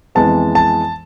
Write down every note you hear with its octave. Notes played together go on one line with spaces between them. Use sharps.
F2 E3 G#3 B3 A5
A5